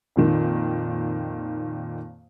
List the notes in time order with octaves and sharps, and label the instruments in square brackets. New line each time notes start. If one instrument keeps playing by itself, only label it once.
[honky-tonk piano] F2 A#2 D#3